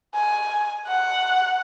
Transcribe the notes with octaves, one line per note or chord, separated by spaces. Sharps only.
G#5
F#5